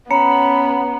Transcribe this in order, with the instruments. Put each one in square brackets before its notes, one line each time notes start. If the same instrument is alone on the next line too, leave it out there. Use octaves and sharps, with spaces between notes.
[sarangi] B3 [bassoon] C#4 [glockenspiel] A#5 C#7 [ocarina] B5